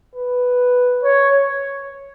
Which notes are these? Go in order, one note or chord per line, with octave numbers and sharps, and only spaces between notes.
B4
C#5